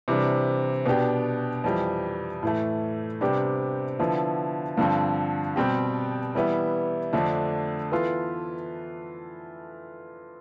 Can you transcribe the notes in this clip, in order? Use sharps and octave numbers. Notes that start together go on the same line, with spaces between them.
C3 E3 G3 D4
B2 B3 D4 G4
F2 E3 G3
A2 E3 A3
C3 G3 B3 D4 G4
D3 F3 B3 E4
G2 D3 F3 C4
B2 G3 C4 G4
E3 G3 B3 E4
F2 D3 A3 D4
E3 B3 F4 A4